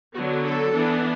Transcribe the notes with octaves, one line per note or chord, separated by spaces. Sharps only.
D3 F#3 B3 F#4
A4
E3 B3 D4